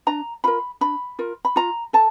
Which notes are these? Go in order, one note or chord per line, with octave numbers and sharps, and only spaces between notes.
D4 A#5
F4 A#4 B5
D4 B5
F4 A#4
B5
F4 A#5
A4 A5